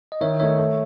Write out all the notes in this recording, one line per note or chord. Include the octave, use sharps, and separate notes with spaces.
D#5
D#3 C#5 E5
A3 D#4 C#5 E5
A3